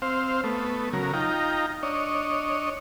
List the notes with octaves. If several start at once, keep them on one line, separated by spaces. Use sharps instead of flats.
C4 C5 F5
A3 B3
C#3 F#3 A#4
D#4 F4 G5 A#5
D4 C#5 D#5